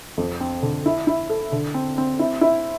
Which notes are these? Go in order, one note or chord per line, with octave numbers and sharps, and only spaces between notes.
F2
C4
D3
E4
E4
A4
D3
C4
C4
E4
E4